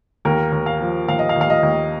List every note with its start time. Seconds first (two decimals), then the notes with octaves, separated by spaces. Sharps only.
0.25 D#2 A#4
0.52 D#2
0.66 F5
0.81 F3
1.08 D#2 F5
1.19 D#5
1.29 F5
1.36 D#2
1.41 F5
1.50 D#5
1.63 D#2